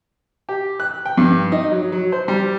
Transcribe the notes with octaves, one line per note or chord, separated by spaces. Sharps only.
G4
F#6
G5
G2
D#4
F#3
F#3
C5
G3